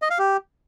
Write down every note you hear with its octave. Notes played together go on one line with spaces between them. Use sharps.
D#5
F5
G4